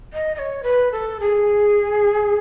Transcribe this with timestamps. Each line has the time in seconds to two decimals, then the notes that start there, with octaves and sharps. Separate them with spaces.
0.13 D#5
0.35 D#5
0.38 C#5
0.63 B4
0.92 A4
1.20 G#4